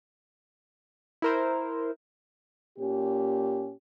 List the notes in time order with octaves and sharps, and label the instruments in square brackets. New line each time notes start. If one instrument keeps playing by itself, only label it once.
[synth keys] E4 A#4 C5
[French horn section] A#2 C#4 G4